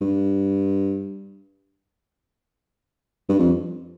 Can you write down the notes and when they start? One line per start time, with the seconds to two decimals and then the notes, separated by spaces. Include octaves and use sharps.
0.01 G2
3.29 G2
3.39 F2